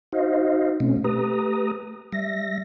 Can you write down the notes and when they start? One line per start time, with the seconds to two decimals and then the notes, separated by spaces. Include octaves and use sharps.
0.12 D#4 F#4 C5 D#5 F5
0.80 B2 A3 C4 C#4
1.04 A3 G4 B4 A#5 D#6
2.13 G3 E5 A#6